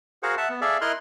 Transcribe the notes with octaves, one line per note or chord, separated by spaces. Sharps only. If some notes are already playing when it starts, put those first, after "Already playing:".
F#4 G#4 A#4 C5 F5 F#5
E5 F#5 A5
B3
G#4 A4 D5 E5 F5
E4 A#4 D#5 C6 F6 F#6